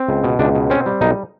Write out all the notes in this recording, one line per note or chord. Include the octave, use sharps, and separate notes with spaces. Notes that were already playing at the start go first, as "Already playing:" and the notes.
Already playing: C4
C#2
B2
C#2 D4
B2
C4 C#4
G3
B1 D#4